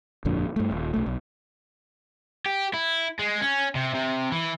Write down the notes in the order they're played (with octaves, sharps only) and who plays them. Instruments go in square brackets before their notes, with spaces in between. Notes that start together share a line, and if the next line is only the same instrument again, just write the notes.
[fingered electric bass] G1 F2 A#2 D3
G2 A3
D#1
B1 A3
B1
[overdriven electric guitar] G4
E4
G#3
C#4
C3
C3
E3